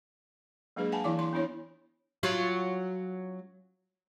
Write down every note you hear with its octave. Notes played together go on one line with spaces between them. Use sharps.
F#3 G#3 A#3 D4 G#4 B4
F5 F#5 G#5 A5 B5
E3 E4 D5 F5 D6
C6
B3 D4 E4 C#5
F#3 C#4 F4